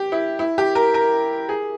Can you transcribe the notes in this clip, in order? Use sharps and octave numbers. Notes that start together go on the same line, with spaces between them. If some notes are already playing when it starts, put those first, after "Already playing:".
Already playing: G4
E4
E4
G4
A#4
A#4
G#4